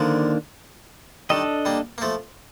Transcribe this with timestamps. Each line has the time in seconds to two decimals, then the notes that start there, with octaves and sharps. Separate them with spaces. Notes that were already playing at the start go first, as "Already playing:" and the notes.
Already playing: D3 D#3 F3 A#3 D4
1.30 D#3 G3 D4 A4 D#5
1.65 G3 A#3
1.98 A#3
2.02 F3 A3